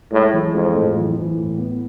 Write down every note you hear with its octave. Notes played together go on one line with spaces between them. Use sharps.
A2 G#3
E3
F2 G#3
A2
E3
E3
A2
B3